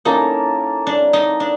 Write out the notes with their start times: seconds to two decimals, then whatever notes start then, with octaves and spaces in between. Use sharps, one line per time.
0.05 A#3 C#4 D#4 E4 A4
0.87 D4
1.13 D#4
1.40 D4